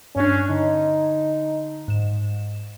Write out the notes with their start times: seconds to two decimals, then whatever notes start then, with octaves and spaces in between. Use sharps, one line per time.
0.16 G2 C#4 D4
0.50 D3 D#4
1.88 G#2 E7